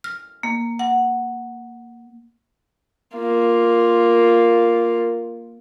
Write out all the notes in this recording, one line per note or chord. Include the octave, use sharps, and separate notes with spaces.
F6
A#3
F#5
A#3 F4